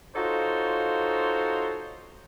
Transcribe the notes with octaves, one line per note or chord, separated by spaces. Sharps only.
D#4 F4 F#4 A4 C5 C#5